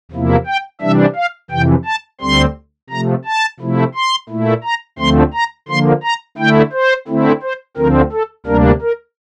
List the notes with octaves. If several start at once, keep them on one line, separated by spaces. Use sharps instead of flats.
E2 C3 F3 A#3 E4
G5
C3 E3 G3 D4 E5
F5
F2 C3 E3 G5
A5
D2 D3 G3 C4 C6
C3 F3 A3 A#5
A5
C3 F3 A3 E4
C6
A#2 A3 E4
A#5
D2 D3 F3 A3 C4 C6
A#5
D3 F3 A#3 C6
A#5
D3 A3 E4 G5
C5
D3 A3 C4 E4
C5
D2 D3 F3 C4 A#4
A4
D2 C3 G3 A#3 D4 A#4
A#4